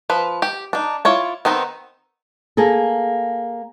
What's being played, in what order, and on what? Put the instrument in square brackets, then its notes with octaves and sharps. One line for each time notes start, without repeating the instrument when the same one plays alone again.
[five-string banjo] F3 B4
G4
D4 D#4
E4 F4 C#5 D5
D#3 B3 C4 D#4
[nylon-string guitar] A#3 G#4 A4